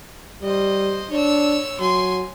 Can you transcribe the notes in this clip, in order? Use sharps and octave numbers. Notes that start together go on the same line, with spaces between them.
G3 C5 D#5
D4 C#5 E6
F#3 G#5 C6